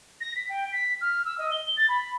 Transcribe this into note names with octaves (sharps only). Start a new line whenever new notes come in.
A#6
B6
G5
B6
F6
E6
D#5
G7
A6
B5